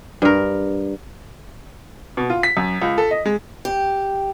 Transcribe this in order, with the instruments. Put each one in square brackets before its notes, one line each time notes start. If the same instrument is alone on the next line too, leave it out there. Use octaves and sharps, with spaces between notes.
[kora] G2 A#4
[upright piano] B2
F4
B6
F#2
C#2
A4
D#5
G#3
[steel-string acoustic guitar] G4